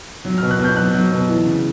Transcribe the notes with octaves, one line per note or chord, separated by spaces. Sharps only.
F#3
F6
B2
F#6
B2 G6
F#3 F#6
F#3
B2
E3
C#3